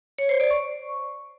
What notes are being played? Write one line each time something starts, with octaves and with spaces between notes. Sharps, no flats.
C#5
C5
D5
C#6